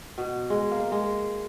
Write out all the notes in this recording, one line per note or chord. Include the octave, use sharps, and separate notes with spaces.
B2
G#3
A#3
G#3